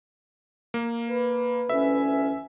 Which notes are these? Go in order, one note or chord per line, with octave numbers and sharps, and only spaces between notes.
A#3
B4
D2 E3 C#4 E5